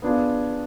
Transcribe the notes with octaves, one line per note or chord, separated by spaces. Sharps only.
B3 D4 F4 G#4